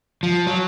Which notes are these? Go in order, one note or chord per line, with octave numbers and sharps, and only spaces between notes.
F3
F#3